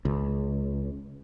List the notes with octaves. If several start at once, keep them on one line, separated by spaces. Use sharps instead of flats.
C#2